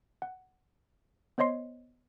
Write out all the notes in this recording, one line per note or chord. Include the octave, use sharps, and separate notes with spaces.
F#5
B3 C5 C#5 D#5 C6 C7